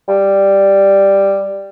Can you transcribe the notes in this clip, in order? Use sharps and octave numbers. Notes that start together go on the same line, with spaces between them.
G3